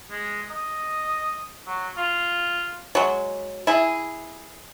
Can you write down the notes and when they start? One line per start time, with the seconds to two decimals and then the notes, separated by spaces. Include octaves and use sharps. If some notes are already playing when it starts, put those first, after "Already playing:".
0.10 G#3
0.50 D#5
1.67 F#3
1.97 F4
2.95 F#3 G#3
3.67 E4 G#4